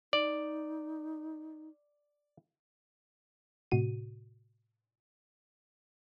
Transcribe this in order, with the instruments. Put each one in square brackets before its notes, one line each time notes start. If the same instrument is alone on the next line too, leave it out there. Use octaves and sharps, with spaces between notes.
[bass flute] D#4 [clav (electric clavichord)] D5
[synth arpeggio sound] A2 C3 F#4 D#7